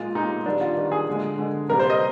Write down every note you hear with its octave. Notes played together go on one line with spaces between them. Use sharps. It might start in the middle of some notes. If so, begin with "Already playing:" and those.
Already playing: A#2 G#3 F4
A#2 G#3 D#4
D#3 G3 A#3 D4
F4
D#3 G3 A#3
G#4
D3 G#3
D3 G#3
C3 G3 A#3 A#4
C5
D#5